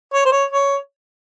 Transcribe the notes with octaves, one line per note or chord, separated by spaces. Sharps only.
C#5
C5
C#5
C#5